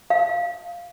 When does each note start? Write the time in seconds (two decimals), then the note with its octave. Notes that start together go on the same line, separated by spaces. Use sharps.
0.10 F5